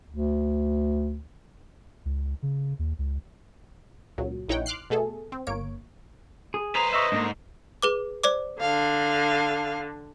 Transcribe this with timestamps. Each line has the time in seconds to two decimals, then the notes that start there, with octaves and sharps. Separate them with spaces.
0.10 D2
2.05 C#2
2.43 C#3
2.79 D#2
2.99 C#2
4.18 C#2 A#2 F#3
4.49 A#1 D#4 E4 C#5 F#5 G5
4.66 C6 D6 F6 F#6 C7
4.90 B2 A3 G#4 A4
5.32 C4
5.47 G1 A#3 C#5 D7
6.54 G#4
6.75 G#4 B4 C5 A#5
6.93 D#5 E5 A#5 C#6
7.12 G#2 A3 A#3 D4
7.82 G#4 B4 D6
8.24 C5 D5 D6
8.61 D3 F5